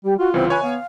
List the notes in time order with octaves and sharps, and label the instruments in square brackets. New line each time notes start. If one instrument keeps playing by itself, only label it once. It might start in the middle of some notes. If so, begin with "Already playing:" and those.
[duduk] G3 [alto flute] G4
[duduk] F4 [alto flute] F#4
[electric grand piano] C2 C#3 E3 [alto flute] C4
[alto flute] B4 [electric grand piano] C#5 G#5
[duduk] B3 [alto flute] F5